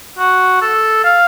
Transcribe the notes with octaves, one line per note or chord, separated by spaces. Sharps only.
F#4
A4
F5